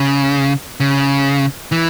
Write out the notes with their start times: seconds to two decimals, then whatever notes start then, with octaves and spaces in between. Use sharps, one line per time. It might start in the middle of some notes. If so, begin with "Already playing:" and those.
Already playing: C#3
0.80 C#3
1.72 E3